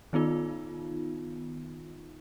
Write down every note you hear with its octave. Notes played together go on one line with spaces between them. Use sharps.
D#3 B3 D#4 F4